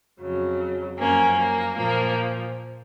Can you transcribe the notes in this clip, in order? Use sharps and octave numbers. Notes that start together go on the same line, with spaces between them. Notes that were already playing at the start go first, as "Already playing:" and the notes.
F2 C#3 F#3
F#2 F3 A#3 C#4
A#3
A#2 F3 A#3